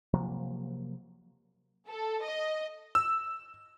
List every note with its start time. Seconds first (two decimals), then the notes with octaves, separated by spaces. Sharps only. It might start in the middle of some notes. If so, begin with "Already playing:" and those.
0.14 C3 F3 F#3 A#3
1.88 A4
2.23 D#5
2.95 E6